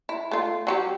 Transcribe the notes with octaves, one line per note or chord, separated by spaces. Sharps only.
E4
A3 F4
F#3 F#4 G4